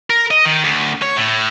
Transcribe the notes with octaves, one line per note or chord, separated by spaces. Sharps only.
A#4
D#5
D#3
D2
C#5
A2